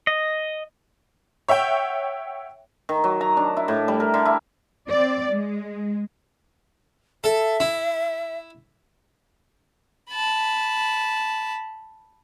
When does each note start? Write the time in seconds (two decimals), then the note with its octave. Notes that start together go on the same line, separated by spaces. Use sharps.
0.07 D#5
1.48 C#5 E5 F#5 G5
2.89 D#3
3.04 F#3
3.21 A#5
3.37 D4
3.57 E4
3.68 A2
3.88 G3
4.00 A#4
4.14 D3
4.25 E4
4.88 C4 D5
5.31 G#3
7.24 A4 E5
7.60 E4
10.11 A5 B5